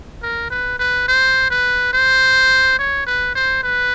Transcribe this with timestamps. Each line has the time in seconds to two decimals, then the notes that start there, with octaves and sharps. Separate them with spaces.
0.23 A#4
0.50 B4
0.79 B4
1.08 C5
1.50 B4
1.93 C5
2.79 C#5
3.06 B4
3.35 C5
3.63 B4